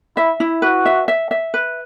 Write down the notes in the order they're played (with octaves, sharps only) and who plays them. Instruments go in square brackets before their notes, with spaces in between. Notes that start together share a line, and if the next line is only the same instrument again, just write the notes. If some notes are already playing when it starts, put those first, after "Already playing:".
[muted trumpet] E4 [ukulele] E5
[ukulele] E4
[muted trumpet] F#4 [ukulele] B4
[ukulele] E5
E5
E5
B4